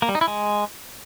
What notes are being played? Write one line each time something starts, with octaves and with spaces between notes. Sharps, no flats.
A#3
G3
D#4
E4
G#3